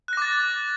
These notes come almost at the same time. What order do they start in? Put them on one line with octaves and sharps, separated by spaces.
F#6 A#6 D6 A6